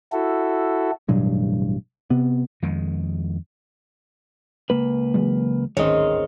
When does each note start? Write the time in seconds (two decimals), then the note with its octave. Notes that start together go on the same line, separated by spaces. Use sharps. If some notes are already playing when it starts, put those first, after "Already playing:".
0.12 E4 F#4 A4
1.08 A1 G2 B2 F#3
2.10 C3 B3
2.62 F2 D#3 G#3
4.70 C#2 A#3 B4
5.14 E3 F#3 G#3
5.77 D1 G#1 G#2 D#3 C4 C#4 C#5 D#5